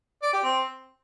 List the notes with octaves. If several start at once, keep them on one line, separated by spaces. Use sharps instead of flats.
D5
G4
C4